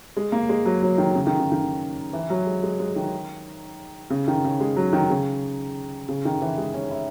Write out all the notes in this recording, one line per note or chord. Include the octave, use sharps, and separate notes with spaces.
G#3
A#3
G#3
F#3
F#3
D#3
C#3
D#3
C#3
D#3
E3
F#3
G#3
G#3
G#3
D#3
C#3
D#3
C#3
G#3
F#3
D#3
C#3
C#3
D#3
E3
G#3
C#4
E4